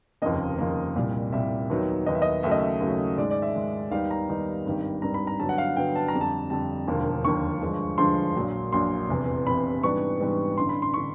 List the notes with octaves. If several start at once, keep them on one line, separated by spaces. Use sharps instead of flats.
F1 D#2 C#3 F3 A#3 D#5
F1 D#2 C#3 F3 A#3
C2 A#2 G3
C2 A#2 G3 E5
D#2 D#3 F#3 B3 D#4
D#2 D#3 F#3 B3 D#4 D#5
E5
D#5
D#2 C#3 F#3 A3 E5
D#5
E5
D#2 C#3 F#3 A3
G#2 D#3 G#3 D5
D5
E5
G#2 D#3 G#3
D#2 D#3 G3 B3 D#4 F5
A#5
D#2 D#3 G3 B3 D#4
G#1 G2 D#3 G3
G#1 G2 D#3 G3 A#5
B5
A#5
G2 D3 F#3 B3 A5
F#5
F5
F#5
G2 D3 F#3 B3 G5
A5
A#5
F2 D3 G3
A5
F2 D3 G3 A5
E1 D#2 D3 F3 A#3
E1 D#2 D3 F3 A#3 C#6
G2 D3 F3 G#3
G2 D3 F3 G#3 C6
A#1 A#2 F#3
A#1 A#2 F#3 C6
F1 E2 C3 E3
F1 E2 C3 E3 B5
G#2 E3 G3 B3 D4 C#6
G#2 E3 G3 B3 D4
A1 G2 D3 C6
B5
C6
D3 C#6